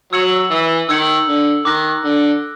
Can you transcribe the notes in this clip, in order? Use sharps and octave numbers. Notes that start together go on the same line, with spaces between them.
F#3 E6 G#6 C#7 F#7
E3
D#3 E6 G#6 C#7 F#7
D3
D#3 D6 F#6 A#6
D3